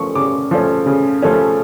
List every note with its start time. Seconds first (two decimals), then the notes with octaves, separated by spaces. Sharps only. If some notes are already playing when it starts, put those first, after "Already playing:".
Already playing: C#3 F3 A3 C#4 C#6
0.15 C#3 D6
0.51 F3 A3 C#4
0.86 C#3
1.22 F3 A3 C#4